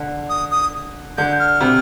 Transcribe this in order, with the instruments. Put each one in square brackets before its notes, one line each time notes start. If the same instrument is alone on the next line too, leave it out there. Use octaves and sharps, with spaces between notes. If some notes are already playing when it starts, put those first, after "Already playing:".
Already playing: [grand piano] D3
[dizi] D#6
D#6
[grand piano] D3 [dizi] G6
[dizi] F6
[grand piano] C3